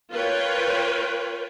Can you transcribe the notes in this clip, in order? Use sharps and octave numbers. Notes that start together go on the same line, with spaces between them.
F4 A#4 B4 C#5 G5